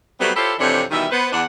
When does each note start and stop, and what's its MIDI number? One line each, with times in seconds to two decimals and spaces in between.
0.20 0.31 54
0.20 0.31 55
0.20 0.31 57
0.20 0.31 59
0.20 0.31 60
0.36 0.54 64
0.36 0.54 65
0.36 0.54 67
0.36 0.54 69
0.36 0.54 72
0.36 0.54 73
0.59 0.84 41
0.59 0.84 48
0.59 0.84 52
0.59 0.84 62
0.59 0.84 69
0.59 0.84 73
0.91 1.06 47
0.91 1.06 51
0.91 1.06 52
0.91 1.06 55
0.91 1.06 76
1.11 1.29 59
1.11 1.29 71
1.11 1.29 72
1.33 1.43 40
1.33 1.43 62
1.33 1.43 78